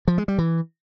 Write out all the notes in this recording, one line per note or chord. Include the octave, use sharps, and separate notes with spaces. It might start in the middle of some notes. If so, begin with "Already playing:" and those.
F3
G#3
G3
E3